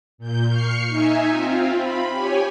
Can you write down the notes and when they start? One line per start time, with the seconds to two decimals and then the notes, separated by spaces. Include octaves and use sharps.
0.18 A#2 G6
0.48 C#6 F6 C7 C#7
0.88 D#4 E5 G#5
1.28 C4 F4
1.76 B5
2.11 G4 C#5 G#5